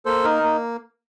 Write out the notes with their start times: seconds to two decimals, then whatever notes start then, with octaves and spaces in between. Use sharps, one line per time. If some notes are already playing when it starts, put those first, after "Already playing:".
0.05 A#3 A4 C5
0.24 D#4 A#4
0.44 A#3